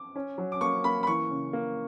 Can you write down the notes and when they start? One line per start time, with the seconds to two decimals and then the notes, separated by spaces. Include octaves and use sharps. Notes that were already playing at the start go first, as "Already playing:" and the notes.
Already playing: D6
0.16 C#4
0.38 F#3
0.52 D6
0.61 A#3 C#6
0.84 A#3 B5
1.03 B5
1.07 E3 C#6
1.30 C#3
1.53 A#3